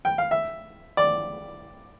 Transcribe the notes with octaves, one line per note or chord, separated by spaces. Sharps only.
G5
F5
E5
D5